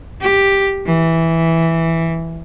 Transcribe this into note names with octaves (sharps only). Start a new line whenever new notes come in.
G4
E3